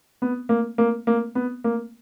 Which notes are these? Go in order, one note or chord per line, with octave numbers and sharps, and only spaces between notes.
B3
A#3
A#3
A#3
B3
A#3